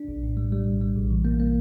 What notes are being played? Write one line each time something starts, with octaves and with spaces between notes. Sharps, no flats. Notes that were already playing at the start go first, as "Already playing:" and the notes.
Already playing: D4
A#1
A2
G3
G3
A#1
G3
A#1
E3
A#3
A#3